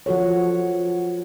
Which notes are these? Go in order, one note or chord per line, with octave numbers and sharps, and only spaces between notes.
F3 F#4 A4 C#5